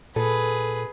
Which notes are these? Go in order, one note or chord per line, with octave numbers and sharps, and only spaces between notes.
A#2 G#4 A4 B4